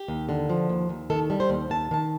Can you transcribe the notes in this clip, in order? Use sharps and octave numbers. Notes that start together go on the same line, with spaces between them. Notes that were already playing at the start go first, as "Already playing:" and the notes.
Already playing: G4
D#2
D3
F3
D#2
D#2
D#3 A4
G3
C5
D#2
D#2 A5
D#3 A5